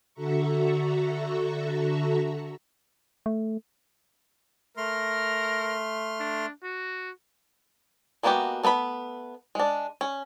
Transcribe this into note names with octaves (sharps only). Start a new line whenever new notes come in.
D3 F#4 A4 E5 A#5 C#6
A3
A3 A#4 C6 F6
D4
F#4
G#3 A#3 B3 F#4 G4
A3 B3 B4 B5
G#3 D4
C#4